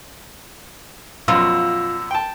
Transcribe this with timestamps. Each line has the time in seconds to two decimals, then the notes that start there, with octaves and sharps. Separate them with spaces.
1.28 F#2 B2 F3 F4 E6
2.11 G5 A5